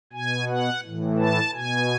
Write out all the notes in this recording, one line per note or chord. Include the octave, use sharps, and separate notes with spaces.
B2 G#5
F#5
A2 E3
A5
B2 G#5